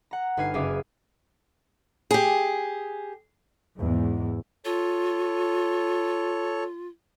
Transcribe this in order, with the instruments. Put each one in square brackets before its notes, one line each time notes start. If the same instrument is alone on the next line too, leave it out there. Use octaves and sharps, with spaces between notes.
[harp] F#5 A#5
G1 D#4 B4 G#5 F6 C7
F#1 G#4 E5 F5 D6 D#6
[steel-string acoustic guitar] G4 G#4
[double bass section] E2 G#2
[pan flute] F4 [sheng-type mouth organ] A4 C#5